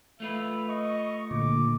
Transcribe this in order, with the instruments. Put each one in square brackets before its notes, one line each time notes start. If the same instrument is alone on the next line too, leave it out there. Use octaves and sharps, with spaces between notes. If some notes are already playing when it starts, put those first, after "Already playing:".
[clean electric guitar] A3 F4 B4 [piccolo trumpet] E5
[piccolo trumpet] D#5 [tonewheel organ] C#6
[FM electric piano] A#2 [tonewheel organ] D3 [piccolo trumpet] D6